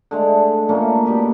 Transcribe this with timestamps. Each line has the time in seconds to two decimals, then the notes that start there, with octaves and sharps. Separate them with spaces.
0.11 D3 G#3 A3
0.69 A#2 A3 A#3 C#4
1.06 B2 G4 B4